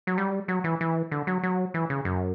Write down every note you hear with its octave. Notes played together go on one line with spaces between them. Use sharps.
F#3
G3
F#3
E3
E3
D3
F#3
F#3
E3
C#3
F#2